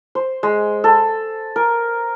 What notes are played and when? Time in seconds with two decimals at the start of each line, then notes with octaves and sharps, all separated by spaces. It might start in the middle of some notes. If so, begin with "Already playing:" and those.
0.15 C5
0.43 G#3
0.84 A4
1.56 A#4